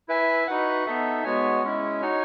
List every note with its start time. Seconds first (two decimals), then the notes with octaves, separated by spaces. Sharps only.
0.08 E4 B4 E5 G#5
0.47 D#4 F#4 B4 F#5
0.86 B3 D#4 A4 E5
1.24 G#3 B3 F#4 C#5 G#5
1.63 G#3 C#4 E4
2.02 D#4 F#4 C#5 G#5